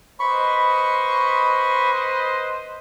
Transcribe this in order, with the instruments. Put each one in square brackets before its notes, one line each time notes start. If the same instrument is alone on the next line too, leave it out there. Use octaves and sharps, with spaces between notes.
[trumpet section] B4 C5 D#5 [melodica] B5 C#6